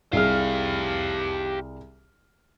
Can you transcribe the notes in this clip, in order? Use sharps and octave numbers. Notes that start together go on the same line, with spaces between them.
C2 G4 G#4 F5 F6